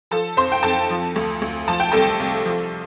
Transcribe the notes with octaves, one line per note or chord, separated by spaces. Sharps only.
F3 A4 A5
F2 C5 C6
G5
F2 A4 A5
F3
D2
D2
F3 A5
G5
C2 A4 A5
C2
F3